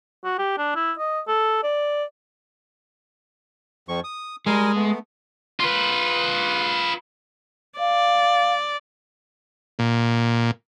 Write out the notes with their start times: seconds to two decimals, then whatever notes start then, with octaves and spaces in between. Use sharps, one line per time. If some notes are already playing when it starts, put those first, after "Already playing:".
0.25 F#4
0.38 G4
0.58 D4
0.76 E4
0.99 D#5
1.28 A4
1.64 D5
3.89 F2 F3 C#6
4.04 D#6
4.46 G3 G#3 A#4 G#5
4.76 A3 B3
5.60 F4 B4
7.79 D5 F5
9.79 A#2